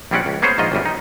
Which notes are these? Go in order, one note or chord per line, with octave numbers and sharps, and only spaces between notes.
A#1 G3 C4 C#4 D5 F#5
C#2
A#3 B3 C#4 G#4 C5 C#5
A#1 G#2 D#3 F4 D#5
G1 C2 F#2 G3
D#4